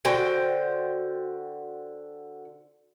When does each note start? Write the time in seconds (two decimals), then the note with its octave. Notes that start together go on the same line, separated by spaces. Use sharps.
0.05 D3 F#4 C5 G5